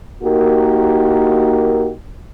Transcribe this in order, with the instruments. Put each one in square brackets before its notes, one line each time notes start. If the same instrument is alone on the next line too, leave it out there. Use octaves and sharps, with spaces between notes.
[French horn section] A#3 D#4 F#4 G4 A#4